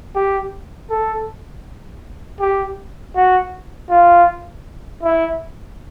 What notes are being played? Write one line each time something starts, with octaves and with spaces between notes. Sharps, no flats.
G4
A4
G4
F#4
F4
E4